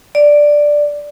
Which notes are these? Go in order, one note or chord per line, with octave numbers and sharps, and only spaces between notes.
D5